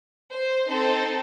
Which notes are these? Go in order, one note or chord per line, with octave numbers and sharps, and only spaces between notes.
C5
C4 D#4 A4 C5